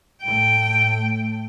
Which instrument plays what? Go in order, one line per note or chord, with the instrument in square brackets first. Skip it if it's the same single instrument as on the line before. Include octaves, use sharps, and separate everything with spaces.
[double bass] A2 A3 [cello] G5